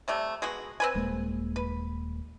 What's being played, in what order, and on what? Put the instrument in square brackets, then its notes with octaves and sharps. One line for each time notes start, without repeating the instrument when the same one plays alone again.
[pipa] C3 G3 A3
G#3 B3 F#4
C4 B4 G#5
[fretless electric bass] D#1 G#3 A#3
[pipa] B4